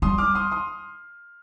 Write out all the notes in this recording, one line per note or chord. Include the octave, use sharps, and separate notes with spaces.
G3 C6 D#6
D6 F6
C6 D#6
C6 D#6